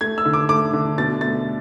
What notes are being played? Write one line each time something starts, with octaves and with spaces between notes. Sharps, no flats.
A3 G#6
E6
D3
D6
A3 D6
D3
B2 A6
A3 A6